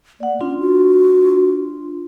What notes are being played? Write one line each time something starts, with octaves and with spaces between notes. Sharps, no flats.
A#3 D5 F#5
C#4 D4 F4 C6
F#4